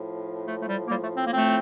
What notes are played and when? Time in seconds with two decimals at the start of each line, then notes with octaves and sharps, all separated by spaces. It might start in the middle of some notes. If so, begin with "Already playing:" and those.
Already playing: A2 F3
0.46 A3
0.60 A3
0.68 G3
0.88 A2 F3 G3 A#3
1.03 A3
1.16 C4
1.25 A#3
1.33 A3 C4